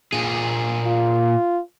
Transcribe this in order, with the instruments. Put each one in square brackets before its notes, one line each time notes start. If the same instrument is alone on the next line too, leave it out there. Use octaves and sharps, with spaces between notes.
[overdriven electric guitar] A#2 G#4
[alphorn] F4